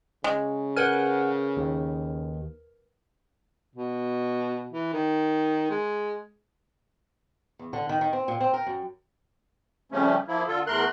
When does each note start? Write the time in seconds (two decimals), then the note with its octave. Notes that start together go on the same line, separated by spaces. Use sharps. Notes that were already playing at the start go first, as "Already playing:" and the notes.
0.24 C#3 G#3
0.77 A#4 B4 F#5 G#5 F6
1.57 D#2
3.75 B2
4.73 E3
4.93 D#3
5.71 G#3
7.59 E2
7.73 D3
7.89 D#3
8.01 D#3
8.13 C4
8.28 A#2
8.41 C4
8.54 A#4
8.67 F#2
9.92 F2 C#3 F3 G3 A3 C#4
10.28 F3 A#3 E4
10.48 D3 F4 A4
10.67 E2 A3 A#4 C6 F#6